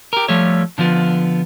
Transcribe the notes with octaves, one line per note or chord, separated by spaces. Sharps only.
G4 A#4
F3 G3 A3 A4 C#5
D3 F3 B3 F4